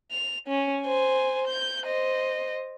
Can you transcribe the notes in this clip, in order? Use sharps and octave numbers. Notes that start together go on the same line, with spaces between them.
F7
C#4
C5 G#5
G6
C5 D#5